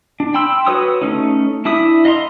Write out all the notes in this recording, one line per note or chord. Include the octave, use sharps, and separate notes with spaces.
D4
G5 B5 C6 E6
F#4 B4 C#5 D#6 E6
A3 A#3 C#4 D#4
D4 E4 E5 D#6
D#5 F5 A#5 C6